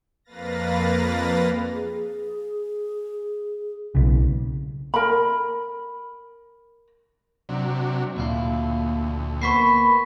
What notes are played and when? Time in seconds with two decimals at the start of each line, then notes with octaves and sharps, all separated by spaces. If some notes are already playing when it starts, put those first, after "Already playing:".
0.24 F2 A#3 B4 F5 A6 A#6
1.73 G#4
3.95 B1 C#3
4.94 A#4 B5
7.49 C3 F#3 D4
8.16 D2 A#2 E4 F4
9.42 A#3 B3 C5 B5 C#6 B6 C7